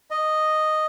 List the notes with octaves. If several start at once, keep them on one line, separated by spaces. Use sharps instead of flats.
D#5